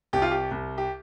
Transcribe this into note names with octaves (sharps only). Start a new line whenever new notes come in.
C2 G4
F4
G4
C2
G4